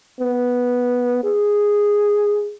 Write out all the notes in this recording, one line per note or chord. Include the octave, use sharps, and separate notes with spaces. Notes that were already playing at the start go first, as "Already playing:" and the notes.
B3
G#4